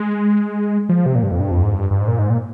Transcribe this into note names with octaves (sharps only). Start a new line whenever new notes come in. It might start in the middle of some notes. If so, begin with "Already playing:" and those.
Already playing: G#3
F3
C3
A#2
G2
F2
G2
F2
G#2
G2
G2
G#2
A#2
G#2
A#2